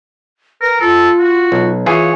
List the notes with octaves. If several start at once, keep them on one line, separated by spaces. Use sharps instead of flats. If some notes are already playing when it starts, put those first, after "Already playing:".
A#4 B4
F4 A4
F#4
B1
E3 F4 G#4 C#5 F5